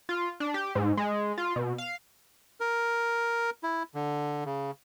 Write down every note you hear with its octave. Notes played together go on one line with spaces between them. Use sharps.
F4
D4
G4
G#2
G#3
F4
B2
F5
A#4
E4
D3
C#3